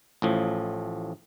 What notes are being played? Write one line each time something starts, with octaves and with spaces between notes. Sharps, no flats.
A1 A2 F3